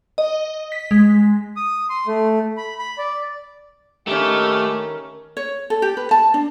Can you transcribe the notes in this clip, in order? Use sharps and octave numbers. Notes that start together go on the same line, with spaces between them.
D#5
B6
G#3
D#6
C6
A3
B5
B5
D5
D#2 A2 D#3 A3 C#4 G4
C#5
A4
G4
B4
A5
D4